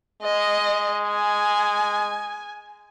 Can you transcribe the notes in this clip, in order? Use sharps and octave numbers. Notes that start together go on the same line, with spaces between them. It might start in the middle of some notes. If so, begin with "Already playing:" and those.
G#3 D#5
G#5